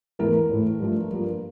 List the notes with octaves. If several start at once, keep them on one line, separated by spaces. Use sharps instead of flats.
E2 E3 A3 A#4
A2 E3 A3
G2 F3 A3
G2 F3 A#3